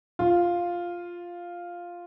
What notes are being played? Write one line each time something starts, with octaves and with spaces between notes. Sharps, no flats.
F4